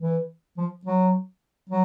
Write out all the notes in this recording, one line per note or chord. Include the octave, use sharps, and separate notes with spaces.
E3
F3
F#3
F#3